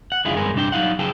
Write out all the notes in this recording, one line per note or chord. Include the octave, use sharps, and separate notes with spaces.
F#5
C#2 F#2 D3 E4 F4 G#4
G2 G#3 B3 A#4 G#5
C2 G2 D4 G5
F#3 G3 D#4 F5 F#5
C#3 F#3 G#4 A4 G5